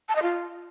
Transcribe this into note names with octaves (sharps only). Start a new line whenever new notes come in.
A5
D#5
F4